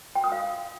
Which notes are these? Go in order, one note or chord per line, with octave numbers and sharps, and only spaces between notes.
G5
D#6
F5